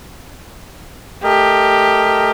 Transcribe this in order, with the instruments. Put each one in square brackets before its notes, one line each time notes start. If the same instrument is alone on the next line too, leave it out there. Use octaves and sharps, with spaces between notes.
[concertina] A3 A#4 D#5 [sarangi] G4